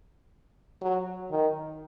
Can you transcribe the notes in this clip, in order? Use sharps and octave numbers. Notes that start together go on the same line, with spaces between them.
F#3
D#3